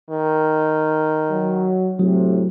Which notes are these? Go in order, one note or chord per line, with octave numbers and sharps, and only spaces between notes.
D#3
F#3
A2 C3 F#3